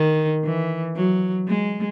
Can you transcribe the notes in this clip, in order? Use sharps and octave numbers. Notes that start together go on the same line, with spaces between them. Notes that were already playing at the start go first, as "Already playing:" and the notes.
Already playing: D#3
E3
F#3
G#3